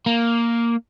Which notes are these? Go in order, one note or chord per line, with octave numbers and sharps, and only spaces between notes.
A#3